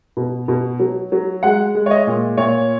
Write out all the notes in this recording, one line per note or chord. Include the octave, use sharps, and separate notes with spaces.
B2
B2
F#3
F#3
G#3 F#5
G#3
C#5
D#5
A#2
A#2 C#5